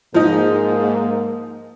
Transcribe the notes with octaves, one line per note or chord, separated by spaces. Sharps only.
G#2 F3 A#3 D#4